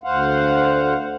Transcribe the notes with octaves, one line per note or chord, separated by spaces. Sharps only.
D2 C5 F5 F#5